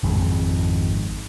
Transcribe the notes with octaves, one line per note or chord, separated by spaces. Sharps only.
G#1 F2 G#2